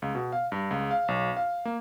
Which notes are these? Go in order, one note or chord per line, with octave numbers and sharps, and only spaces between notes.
C#2
B2
F5
G2
C#2
F5
B1
F5
A#3